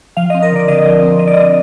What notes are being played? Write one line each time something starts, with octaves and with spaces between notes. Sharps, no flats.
F3 F5
D#5
C4
A#4
D3 D5
D3 D#5
F3
C4
D3 D#5
D5
D3 D#5